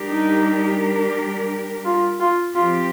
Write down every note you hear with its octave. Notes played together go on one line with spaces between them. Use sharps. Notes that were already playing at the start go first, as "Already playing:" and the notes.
Already playing: G3 D4 G4 A#4
D#4
F4
F4
F3 C4 F4 G4